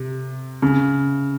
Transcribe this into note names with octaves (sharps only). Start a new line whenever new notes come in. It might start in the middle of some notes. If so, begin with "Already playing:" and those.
Already playing: C3
C#3